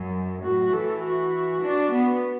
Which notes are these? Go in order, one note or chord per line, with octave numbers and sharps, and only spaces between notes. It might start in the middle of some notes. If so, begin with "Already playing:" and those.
Already playing: F#2
A2 F#4
E3 A4
F#4
D4
B3